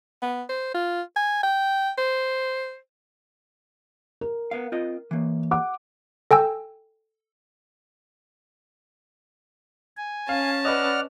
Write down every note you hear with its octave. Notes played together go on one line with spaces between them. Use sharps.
B3
C5
F4
G#5
G5
C5
A#4
B3 F5
C4 F4 D#5
E3 A#3
F#5 D6
A4 G5 G#5 E6
G#5
C#4 F5 A5
B4 D5 D#5 F#5 F6